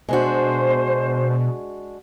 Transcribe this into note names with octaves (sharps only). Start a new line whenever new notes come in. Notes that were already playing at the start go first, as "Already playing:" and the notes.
B2 G#3 D4 F#4 C5